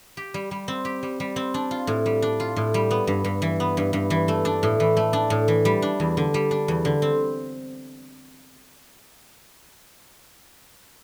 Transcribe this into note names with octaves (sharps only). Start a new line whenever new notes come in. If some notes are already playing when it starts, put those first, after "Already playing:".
G4
G3
G3
C4
G4
G3
G3
C4
D4
F4
A2
G3
D4
F4
A2
G3
B3
G2
G2
E3
B3
G2
G2
E3
A3
D4
A2
E3
A3
D4
A2
E3
G3
D4
E2
D3
G3
D4
E2
D3
C4